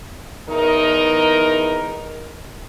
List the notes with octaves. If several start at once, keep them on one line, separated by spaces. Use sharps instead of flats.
E2 D#4 A#4